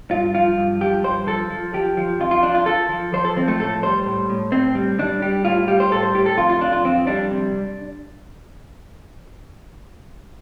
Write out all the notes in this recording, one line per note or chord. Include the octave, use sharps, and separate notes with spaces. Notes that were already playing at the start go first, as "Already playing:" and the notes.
G2 F4
F3 F4
G2
F3 G4
G2 C5
F3 A4
F3
F3 G4
F3
F2 F4
F4
F3 D4
F4
F3 A4
F3
F3 C5
A4
F3 C4
A3
A2 A4
G3 C5
A2
A2
A2 C4
G3
G3 D4
G3 G4
A2 F4
G3 G4
C5
A2 A4
C5
A2 G4
A4
F2 F4
F4
F2 D4
F4
F2 C4
G3 D4
C3